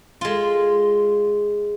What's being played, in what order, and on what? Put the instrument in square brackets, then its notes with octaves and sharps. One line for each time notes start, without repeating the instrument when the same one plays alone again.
[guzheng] G#3 F4